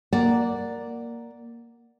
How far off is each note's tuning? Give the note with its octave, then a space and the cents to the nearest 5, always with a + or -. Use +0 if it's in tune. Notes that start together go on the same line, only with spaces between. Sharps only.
A#3 +0 D5 +0 F#5 -5